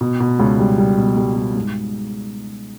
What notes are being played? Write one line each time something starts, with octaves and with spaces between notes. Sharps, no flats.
B2
B2
C#2
G3
G3
B2
G3
G3
G#2